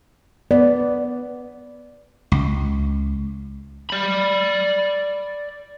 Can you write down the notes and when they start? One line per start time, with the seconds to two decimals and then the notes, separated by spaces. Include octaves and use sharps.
0.51 B3 D5
2.32 C#2
3.90 D5 B5